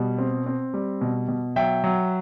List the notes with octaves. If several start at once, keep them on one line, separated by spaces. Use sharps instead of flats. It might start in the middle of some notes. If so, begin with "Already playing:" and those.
Already playing: B2 G3
C4
C4
G3
B2
B2
F#3 E5 G5
F#3